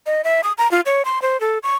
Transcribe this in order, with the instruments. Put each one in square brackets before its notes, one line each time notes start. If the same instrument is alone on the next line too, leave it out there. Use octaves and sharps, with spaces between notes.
[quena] D#5
E5
D#6
A#5
F4
C#5
C6
C5
A4
C#6